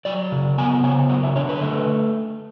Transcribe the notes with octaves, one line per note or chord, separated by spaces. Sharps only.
F#3 D5
C#3
B3 G#5
C#3 G#5
F#3 F#5
E5
D3 C#5
B4
A3